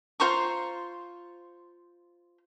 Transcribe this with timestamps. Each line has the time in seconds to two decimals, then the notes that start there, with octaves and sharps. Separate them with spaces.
0.20 F4 C5 A#5 C#6